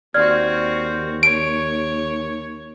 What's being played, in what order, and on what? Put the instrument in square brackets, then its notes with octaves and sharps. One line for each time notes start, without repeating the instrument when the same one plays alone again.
[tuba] D#2 [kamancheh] C4 F#4 [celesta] D5 F6 G#6
[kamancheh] C#5 [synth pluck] D7